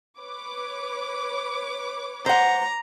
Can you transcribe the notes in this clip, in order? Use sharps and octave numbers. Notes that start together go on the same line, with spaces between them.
B4 C#5 D6
C5 F#5 A#5